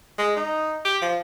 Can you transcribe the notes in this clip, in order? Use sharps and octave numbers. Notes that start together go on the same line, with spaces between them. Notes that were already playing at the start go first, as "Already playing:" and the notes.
G#3
D#4
G4
F3